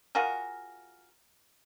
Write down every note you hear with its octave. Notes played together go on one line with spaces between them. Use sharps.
F4 F#4 G#4 A#4